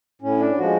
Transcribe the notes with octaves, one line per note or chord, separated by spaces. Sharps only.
A2 C#4
D4
F3 G#3 F#4